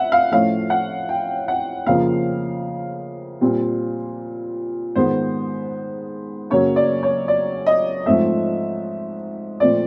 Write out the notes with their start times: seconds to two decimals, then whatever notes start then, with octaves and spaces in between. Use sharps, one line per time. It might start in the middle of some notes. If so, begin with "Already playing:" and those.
Already playing: E5 F#5
0.12 F5
0.31 A2 F3 A3 C#4 F5
0.70 F#5
1.09 G5
1.48 F#5
1.86 F2 C#3 F3 A#3 F5
3.41 A#2 G3 C4
4.96 G#2 D#3 G#3 B3 C5
6.50 F#2 C#3 F#3 A#3 C#4 C#5
6.76 D5
7.03 C#5
7.28 D5
7.67 D#5
8.06 G#2 F3 A3 C4 E5
9.60 A#2 F3 A3 C4 D5